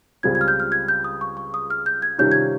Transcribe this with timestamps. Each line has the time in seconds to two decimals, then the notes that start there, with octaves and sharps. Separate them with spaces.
0.23 C#2 C#3 G3 C4 F4 G#6
0.35 G#6
0.41 F6
0.48 G6
0.60 F6
0.72 G#6
0.88 G6
1.04 D#6
1.21 C#6
1.37 C#6
1.54 D#6
1.70 F6
1.86 G6
2.02 G#6
2.18 C3 D#3 G3 C#4 F4 G6
2.32 G#6